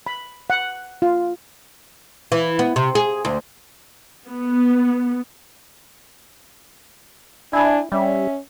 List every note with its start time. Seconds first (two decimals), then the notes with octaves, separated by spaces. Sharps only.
0.07 B5
0.50 F#5
1.02 F4
2.32 E3
2.59 B3
2.76 C3
2.95 G#4
3.25 D2
4.28 B3
7.53 D4 E4 G#5
7.92 G3 C#4 E5